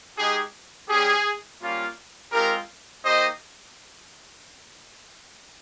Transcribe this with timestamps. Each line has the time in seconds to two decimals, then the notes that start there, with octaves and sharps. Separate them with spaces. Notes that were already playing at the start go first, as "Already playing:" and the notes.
0.17 G#3 D#4 G4 G#4
0.88 G3 C#4 G4 G#4
1.60 G3 A#3 C#4 F4
2.32 G#3 C4 F4 G4 A#4
3.04 A#3 D#4 G4 C5 D#5